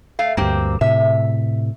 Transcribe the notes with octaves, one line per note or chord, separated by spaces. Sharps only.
A3 F5
D2 G2 A#3 C4 G4
A2 C3 E5